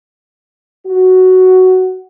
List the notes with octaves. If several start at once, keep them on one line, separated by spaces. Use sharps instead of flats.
F#4